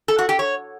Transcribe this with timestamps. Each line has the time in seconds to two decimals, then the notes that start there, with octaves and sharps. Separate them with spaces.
0.08 A4
0.19 F#4
0.29 G4
0.39 C#5